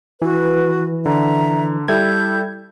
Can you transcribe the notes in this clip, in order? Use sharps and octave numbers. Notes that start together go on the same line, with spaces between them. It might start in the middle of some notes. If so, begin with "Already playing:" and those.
E3 F#4 B4
D3 E5 A#5
G3 E4 A4 E5 G6 G#6